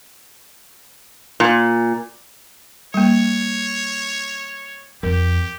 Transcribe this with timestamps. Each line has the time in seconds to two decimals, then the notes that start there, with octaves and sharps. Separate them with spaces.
1.40 A#2
2.94 G3 A#3 C#5
5.03 F2 G4 A#4